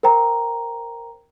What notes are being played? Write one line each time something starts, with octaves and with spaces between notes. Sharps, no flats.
A#4 C5 G5 A#5